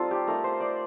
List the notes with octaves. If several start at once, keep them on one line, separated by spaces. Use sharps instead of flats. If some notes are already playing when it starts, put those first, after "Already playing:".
Already playing: G3 C4 D#4 F4 A4
G4
A3 D#4 A#4
C5
D5